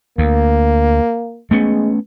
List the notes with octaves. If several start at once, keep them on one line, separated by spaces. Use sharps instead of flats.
D2 A#3
G#3 A3 B3 C#4